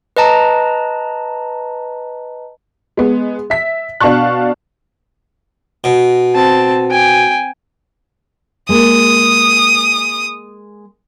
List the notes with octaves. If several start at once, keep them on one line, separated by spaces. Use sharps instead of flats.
B4 D#5 A5 A#5
G#3 B3
E5 B6
B2 D4 F5 A5 C#6 F#6
B2
C4 A5
G5 G#5
G#3 A#3 D#6